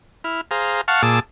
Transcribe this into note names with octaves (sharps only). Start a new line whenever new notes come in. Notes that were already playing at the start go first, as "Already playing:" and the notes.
E4 F6
G#4 C5 F5 A#5
F5 F#5 A5 C#6 F6
A#2 G#4 A5 D6 E6